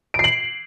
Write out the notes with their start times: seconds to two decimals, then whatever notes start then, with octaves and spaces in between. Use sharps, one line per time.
0.14 D7
0.19 C7
0.24 F#7